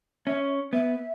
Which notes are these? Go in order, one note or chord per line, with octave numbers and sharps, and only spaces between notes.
C#4 E5
B3 E5